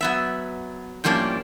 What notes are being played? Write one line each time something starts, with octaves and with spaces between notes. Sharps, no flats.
F#3 B3 E5
A2 F3 G3 A#3 C#4 D4